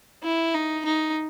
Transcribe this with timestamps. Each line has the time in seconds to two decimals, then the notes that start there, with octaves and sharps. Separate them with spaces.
0.23 E4
0.54 D#4
0.85 D#4